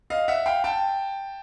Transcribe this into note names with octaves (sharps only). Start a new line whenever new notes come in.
D#5 F5
E5 F#5
F5 G5
G5 A5